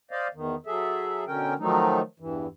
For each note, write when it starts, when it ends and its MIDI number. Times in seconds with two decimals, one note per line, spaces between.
0.11 0.28 72
0.11 0.28 74
0.11 0.28 75
0.11 0.28 77
0.34 0.55 40
0.34 0.55 51
0.66 1.24 54
0.66 1.24 68
0.66 1.24 69
0.66 1.24 76
1.27 1.54 47
1.27 1.54 50
1.27 1.54 61
1.27 1.54 70
1.27 1.54 79
1.59 2.01 51
1.59 2.01 53
1.59 2.01 54
1.59 2.01 57
1.59 2.01 63
2.20 2.47 40
2.20 2.47 43
2.20 2.47 52